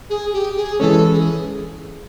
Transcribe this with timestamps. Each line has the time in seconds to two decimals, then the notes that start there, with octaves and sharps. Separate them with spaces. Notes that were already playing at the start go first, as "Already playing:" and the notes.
0.10 G#4
0.33 G4
0.56 G#4
0.79 E3 G#3 C#4 A4
1.13 G#4